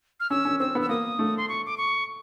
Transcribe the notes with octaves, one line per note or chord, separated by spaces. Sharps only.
F6
C#4 E6
C#4
C4 E6
B3
E6
A#3 D#6
A3
C6
C#6
D6
C#6